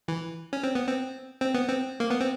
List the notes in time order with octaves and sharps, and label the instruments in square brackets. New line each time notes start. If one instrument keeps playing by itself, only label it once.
[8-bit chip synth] E3
C#4
C4
B3
C4
C4
B3
C4
A#3
B3
C4